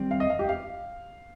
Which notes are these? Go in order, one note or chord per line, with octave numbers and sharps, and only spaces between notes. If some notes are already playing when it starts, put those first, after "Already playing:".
Already playing: D#3 G3 C4
F5
D#5
F5
G4
F5